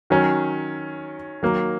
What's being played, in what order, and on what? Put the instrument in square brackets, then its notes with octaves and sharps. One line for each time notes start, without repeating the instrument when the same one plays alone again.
[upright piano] D#3 F#3 C#4
D#3 F#3 A#3